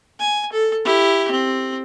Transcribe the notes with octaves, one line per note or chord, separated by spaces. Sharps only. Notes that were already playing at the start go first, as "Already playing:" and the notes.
G#5
A4
E4 G4
C4